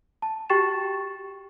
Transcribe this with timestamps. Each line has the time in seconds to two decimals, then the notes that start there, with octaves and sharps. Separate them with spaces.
0.22 A5
0.50 F#4 G4 G5 C#6 A6 E7